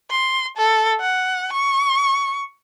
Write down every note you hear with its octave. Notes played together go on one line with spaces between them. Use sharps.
C6
A4
F#5
C#6